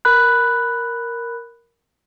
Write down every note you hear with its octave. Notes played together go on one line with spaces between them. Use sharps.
A#4 B5 F#6